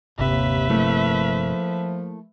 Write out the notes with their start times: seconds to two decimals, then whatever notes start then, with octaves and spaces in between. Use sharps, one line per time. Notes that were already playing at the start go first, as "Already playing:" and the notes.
0.19 G1 D#2 C3 B4 E5
0.70 F3 A3 A#3 E4